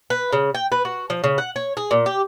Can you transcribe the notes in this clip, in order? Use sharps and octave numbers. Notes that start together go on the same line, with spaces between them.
B4
C#3
G5
B4
F#4
F3
C#3
F#5
C#5
G#4
A#2
G4